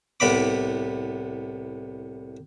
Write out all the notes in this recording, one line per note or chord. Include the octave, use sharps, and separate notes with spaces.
C2 A2 B3 B5 D6